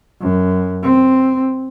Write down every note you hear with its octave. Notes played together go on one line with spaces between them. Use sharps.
F#2
C4